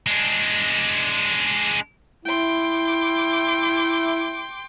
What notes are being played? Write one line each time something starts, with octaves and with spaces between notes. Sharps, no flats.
G#3 D4
E4 G5 C6 D6